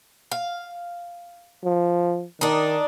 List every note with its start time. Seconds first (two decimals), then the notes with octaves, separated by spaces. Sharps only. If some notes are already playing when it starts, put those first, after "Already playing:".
0.31 F5
1.64 F3
2.41 D#3 D4 D#4